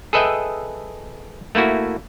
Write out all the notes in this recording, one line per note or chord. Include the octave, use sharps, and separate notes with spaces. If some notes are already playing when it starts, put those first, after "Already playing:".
G#4 A4 B4 D#5 E5 G5
A3 A#3 E4 F#4